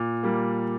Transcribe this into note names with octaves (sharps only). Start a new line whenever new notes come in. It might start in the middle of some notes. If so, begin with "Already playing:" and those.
Already playing: A#2
G3 A#3